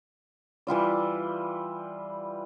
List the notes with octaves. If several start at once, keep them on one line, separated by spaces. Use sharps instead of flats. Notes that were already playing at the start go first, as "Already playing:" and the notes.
E3 G3 F4 D5